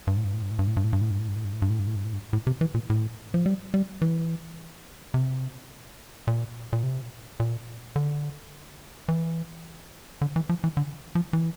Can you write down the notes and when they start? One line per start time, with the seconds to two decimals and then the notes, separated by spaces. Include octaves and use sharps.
0.07 G2
0.17 A2
0.24 G2
0.33 A2
0.42 G2
0.51 A2
0.59 G2
0.67 A2
0.77 G2
0.84 A2
0.93 G2
1.02 A2
1.11 G2
1.19 A2
1.28 G2
1.36 A2
1.45 G2
1.53 A2
1.62 G2
1.70 A2
1.80 G2
1.87 A2
1.96 G2
2.05 A2
2.13 G2
2.33 A2
2.47 C3
2.61 E3
2.74 A#2
2.90 A2
3.34 F3
3.46 G3
3.74 G3
4.02 E3
5.14 C3
6.27 A#2
6.73 A#2
6.83 C3
7.40 A#2
7.96 D3
9.08 E3
10.21 D3
10.36 E3
10.49 F3
10.64 E3
10.77 D3
11.15 F3
11.33 E3